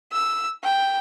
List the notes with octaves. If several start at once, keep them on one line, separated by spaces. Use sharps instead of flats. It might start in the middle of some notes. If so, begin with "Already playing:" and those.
E6
G5